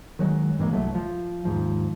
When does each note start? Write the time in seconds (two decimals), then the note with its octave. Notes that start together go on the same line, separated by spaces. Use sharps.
0.19 D#3 F#3 G#3
0.59 G2 E3 G#3 A#3
0.72 C2 F#3 A3
0.95 F3
1.45 D#2 G#2 F3